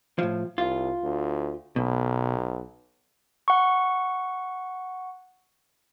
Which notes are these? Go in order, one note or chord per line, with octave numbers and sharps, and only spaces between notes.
A2 F3
C2 F4
D2
B1 B2
F#5 C#6